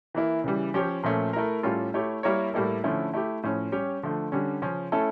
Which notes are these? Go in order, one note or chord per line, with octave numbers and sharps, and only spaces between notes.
E3 A#3 E4
C#3 E3 G3
F3 C#4 G4 C#5
A#2 F3 A3 C#4
A3 E4 A#4
A2 G3 C#4 F4 A4
A3 E4 G4 C#5
G3 A#3 E4 A#4 C#5
A2 G3 A#3 E4 A4
D3 F3 A3 C#4 E4
A3 E4 G4
A2 F3 C#4
G3 C#4 G4 C#5
D3 F3 A3
D3 G3 C#4
C#3 F3 C#4
A3 C#4 E4 A4